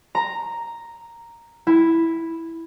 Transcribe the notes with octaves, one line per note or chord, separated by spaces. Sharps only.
A#5
E4